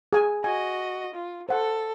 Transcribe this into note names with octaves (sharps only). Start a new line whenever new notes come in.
G#4 G#5
F#4 D#5 G#5
F4
A4 C5 F#5